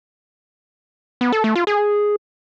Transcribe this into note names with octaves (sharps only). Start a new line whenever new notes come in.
B3
A4
A3
F4
G#4